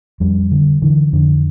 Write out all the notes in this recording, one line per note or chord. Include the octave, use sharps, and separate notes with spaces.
F2 G3
D3
D3 E3
F2 D3